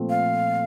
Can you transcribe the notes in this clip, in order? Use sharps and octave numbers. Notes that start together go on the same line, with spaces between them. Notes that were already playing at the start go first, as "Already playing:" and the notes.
Already playing: A#2 F3 A3 C4
F5